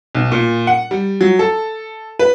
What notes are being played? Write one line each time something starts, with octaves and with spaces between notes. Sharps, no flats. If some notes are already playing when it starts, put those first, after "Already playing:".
B1
A#2
F#5
G3
F#3
A4
B4